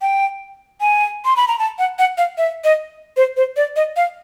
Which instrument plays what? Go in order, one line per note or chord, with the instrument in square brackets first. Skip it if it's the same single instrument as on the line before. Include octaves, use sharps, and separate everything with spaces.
[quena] G5
G#5
C6
B5
A#5
A5
F#5
F#5
F5
E5
D#5
C5
C5
D5
D#5
F5